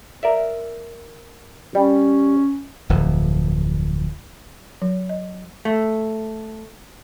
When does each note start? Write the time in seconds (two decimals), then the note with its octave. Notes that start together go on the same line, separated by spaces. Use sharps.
0.23 A#4 D5 E5
1.75 G3 C#4
2.89 D1 F2
4.82 F#3
5.09 D#5
5.65 A3